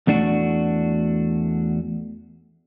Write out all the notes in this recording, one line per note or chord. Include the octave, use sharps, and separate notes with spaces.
E2 A3 D4 F#4